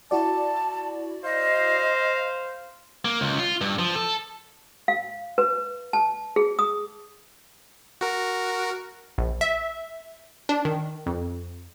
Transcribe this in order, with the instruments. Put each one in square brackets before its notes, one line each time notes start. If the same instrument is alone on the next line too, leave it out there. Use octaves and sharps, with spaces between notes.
[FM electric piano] E4 F#4 D5 [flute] A5
[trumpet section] C5 F5 [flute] D#5
[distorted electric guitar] A#3
C#2
F4
G2
F3
A4
[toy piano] F5
B4
A5
G#4
D#6
[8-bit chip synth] F#4 A#4
[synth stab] A#1
E5
D4
D#3
F2